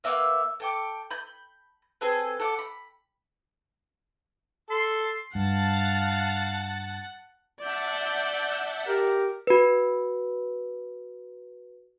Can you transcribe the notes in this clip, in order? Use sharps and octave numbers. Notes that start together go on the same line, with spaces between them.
A#3 B3 E5 F5
A4 G5 D6
B5 G6
C4 G#4 A4 B4
A4 F#5 D6
B5
A4 C6
G2 F5 F#5 A5 A6
D5 E5 F#5 A5 G6
G4 A#4
F#4 B4